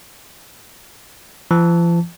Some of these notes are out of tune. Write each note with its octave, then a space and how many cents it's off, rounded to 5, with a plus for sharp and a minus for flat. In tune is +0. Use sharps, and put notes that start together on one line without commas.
F3 -45 A5 +0